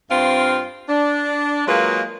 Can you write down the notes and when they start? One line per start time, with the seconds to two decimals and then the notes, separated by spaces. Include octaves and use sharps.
0.10 G2 C4 F4 F5
0.88 D4
1.67 F#3 G#3 A#3 F4 G#4 B4